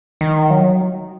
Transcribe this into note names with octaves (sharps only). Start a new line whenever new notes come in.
D#3
F#3